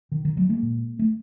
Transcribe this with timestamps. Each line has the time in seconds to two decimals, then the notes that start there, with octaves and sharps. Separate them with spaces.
0.12 B2 D#3
0.25 D#3
0.37 F#3 G#3
0.50 G#3 A#3
0.63 A#2
0.99 A3